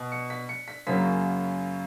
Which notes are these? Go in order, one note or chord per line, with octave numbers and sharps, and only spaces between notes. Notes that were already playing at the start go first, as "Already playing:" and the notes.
Already playing: B2
C#7
B6
C#7
B6
F#2 C#3 F#3 A#3 B6